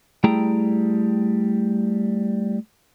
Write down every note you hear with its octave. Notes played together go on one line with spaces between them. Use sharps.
G3 A3 E4 G#4 G5 A#5